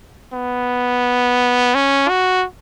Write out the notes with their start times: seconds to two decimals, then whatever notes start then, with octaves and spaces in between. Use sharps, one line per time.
0.33 B3
1.75 C#4
2.09 F#4